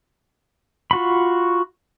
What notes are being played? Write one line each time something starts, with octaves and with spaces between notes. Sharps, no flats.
F4 F#4 B5